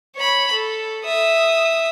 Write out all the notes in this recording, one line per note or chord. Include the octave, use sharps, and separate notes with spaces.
C#5 B5
A4
E5 D#6